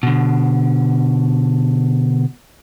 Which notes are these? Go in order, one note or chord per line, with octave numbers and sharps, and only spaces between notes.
B2 D3